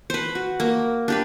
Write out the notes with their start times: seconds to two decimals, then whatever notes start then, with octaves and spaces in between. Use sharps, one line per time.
0.10 B4 C5
0.35 F#4
0.60 A#3
1.08 D4 G4 B4